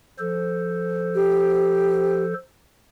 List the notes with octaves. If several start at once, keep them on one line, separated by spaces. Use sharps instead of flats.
F3 A4 C5
G4